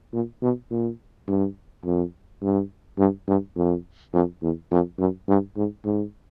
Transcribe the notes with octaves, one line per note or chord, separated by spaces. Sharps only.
A#2
B2
A#2
G2
F2
G2
G2
G2
F2
F2
E2
F2
F#2
G2
G#2
G#2